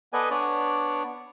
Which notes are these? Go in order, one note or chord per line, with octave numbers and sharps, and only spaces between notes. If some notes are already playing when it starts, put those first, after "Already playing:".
B3 A4 B4 D5 D#5 G#5
B3 D4 C#5 D5